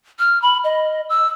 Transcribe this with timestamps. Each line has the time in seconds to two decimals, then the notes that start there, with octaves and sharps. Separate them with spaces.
0.19 F6
0.42 B5
0.64 D#5
1.10 E6